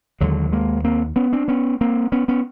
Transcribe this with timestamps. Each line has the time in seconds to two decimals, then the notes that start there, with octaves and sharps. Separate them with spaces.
0.21 D#2 D3 F#3 G#3
0.52 G#3 A#3
0.84 A#3 C4
1.16 B3 C#4
1.33 C4 D4
1.48 B3 C#4
1.81 A#3 C4
2.12 B3 C#4
2.28 B3 C#4